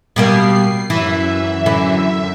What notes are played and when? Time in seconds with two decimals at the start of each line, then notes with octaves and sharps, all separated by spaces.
0.16 B2 G3 A#3 C7
0.90 F#2 E3 E5
1.66 D3 E3